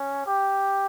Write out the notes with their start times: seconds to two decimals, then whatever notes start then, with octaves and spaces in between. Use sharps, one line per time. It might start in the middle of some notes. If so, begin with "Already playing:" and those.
Already playing: C#4
0.26 G4